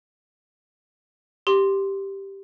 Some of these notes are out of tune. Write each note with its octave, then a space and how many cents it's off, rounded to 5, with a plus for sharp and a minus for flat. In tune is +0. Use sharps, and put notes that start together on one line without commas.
G4 +0 C6 +0 D#6 +0